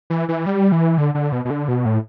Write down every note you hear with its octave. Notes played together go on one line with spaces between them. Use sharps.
E3
E3
G3
E3
D3
D3
B2
B2
D3
B2
A2